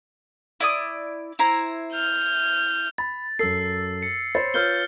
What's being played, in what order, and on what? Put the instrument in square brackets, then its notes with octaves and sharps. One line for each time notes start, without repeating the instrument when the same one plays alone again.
[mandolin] E4 D5 D#6
E4 C5 A#5
[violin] F6 G6
[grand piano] B5 [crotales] A6
[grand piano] F#2 A4 [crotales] E6 C7
[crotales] C#7
[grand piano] C5 C#5 B5 [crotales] A6
[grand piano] F4 B4 C#5 [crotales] F6 G6 G7